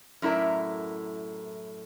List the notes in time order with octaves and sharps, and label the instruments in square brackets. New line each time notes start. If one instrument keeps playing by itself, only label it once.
[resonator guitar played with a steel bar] F#2 A2 E4 A#4 D5